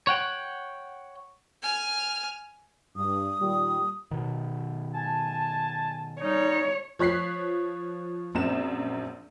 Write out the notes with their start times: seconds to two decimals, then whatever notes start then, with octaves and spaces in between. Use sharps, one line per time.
0.07 C#5 F#5 G5
1.62 G#5 F6
2.97 G2 D#6
3.41 A#2 D#3 G3
4.11 B2 D#3
4.94 G#5 A5
6.21 G3 D#4 C#5
6.99 F3 C#5 F#6 B6 C7
8.35 A#1 F#2 C4 E7